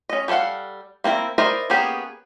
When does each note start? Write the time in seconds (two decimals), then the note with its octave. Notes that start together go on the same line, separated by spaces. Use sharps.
0.09 C#4 D#5
0.28 G3 A4 C#5 F5 F#5
1.04 A#3 C4 E4 A#4
1.38 E4 A#4 C5 D5 D#5
1.70 A#3 B3 C#4 G4 G#4